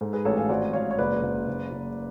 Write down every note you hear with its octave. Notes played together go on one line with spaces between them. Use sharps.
G#2 A4
G#4 B4
A1 A4 C#5
F5 G#5
G#1 D5 F#5
G#1 C#5 F5
C#5
F#1 B4 D5
F#1
F#1
F#1